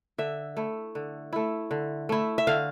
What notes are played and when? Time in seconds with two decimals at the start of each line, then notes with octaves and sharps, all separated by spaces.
0.18 D3 E5
0.57 A3 E4
0.95 D3
1.33 A3 E4
1.71 D3
2.09 A3 E4
2.38 E5
2.47 D3 F5